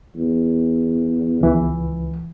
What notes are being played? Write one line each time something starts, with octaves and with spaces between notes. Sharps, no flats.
E2
C#2 E3